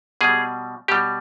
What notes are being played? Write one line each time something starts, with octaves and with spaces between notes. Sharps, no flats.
B2 G3 G#4
B2 G3 G4